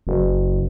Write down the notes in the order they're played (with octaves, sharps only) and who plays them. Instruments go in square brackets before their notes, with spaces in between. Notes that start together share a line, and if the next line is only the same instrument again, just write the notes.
[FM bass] F#1